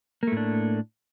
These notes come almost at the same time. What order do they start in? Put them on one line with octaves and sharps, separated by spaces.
A#3 A3 A2 D4